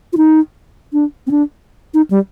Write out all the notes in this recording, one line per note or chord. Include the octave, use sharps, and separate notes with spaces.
F4
D#4
D4
C4
D4
D#4
G3